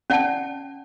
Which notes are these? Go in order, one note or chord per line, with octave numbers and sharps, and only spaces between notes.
C#4 D5 F#5 G5 A5